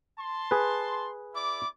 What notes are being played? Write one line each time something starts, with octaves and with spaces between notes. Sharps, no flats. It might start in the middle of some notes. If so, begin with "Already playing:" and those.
A5 C6
G#4 B4
E4 D5 D6